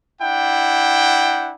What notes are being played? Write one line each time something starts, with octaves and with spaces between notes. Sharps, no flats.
D4 E4 F#5 G5